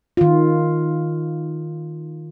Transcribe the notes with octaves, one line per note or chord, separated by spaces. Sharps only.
D#3 F4